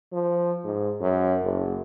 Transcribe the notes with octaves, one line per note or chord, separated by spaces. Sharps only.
F3
G#2
F#2
F#1